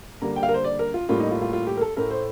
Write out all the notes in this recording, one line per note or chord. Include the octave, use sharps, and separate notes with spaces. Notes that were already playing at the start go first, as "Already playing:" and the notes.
D3 G3 A#3 A#5
G5
F5
A#4
C5
D5
A#4
F4
A2 G3 A#3 F4
D#4
F4
F4
F4
G4
A#4
A4
A2 A3 A#4
C5